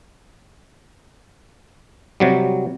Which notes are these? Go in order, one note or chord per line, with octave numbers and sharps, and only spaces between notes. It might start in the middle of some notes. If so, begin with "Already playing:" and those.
C3 F#3 G3